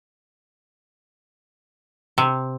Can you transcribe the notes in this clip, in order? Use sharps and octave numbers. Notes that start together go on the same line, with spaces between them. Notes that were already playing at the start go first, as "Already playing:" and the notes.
C3